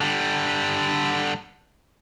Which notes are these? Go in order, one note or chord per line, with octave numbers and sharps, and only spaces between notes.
D3 G3